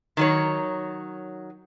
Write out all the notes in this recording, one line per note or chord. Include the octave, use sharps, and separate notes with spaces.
D#3 F#3 C#5